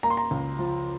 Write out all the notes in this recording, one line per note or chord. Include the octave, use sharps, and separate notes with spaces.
A#3 A#5
C6
A#5
C#2
F3